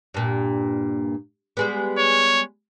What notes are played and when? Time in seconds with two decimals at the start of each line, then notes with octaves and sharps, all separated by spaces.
0.14 G2 A#2
1.57 G3 G#3 B3
1.98 C#5